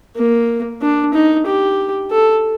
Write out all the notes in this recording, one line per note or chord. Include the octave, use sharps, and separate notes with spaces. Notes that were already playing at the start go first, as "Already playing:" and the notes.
A#3
D4
D#4
G4
A4